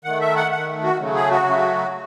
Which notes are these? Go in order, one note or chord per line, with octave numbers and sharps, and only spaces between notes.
D#3 A3 F#5
E5
F#5
D#3 A3 F#5
F#4
C#3 F#3 A3
G#4
F#4
C#3 F#3 A3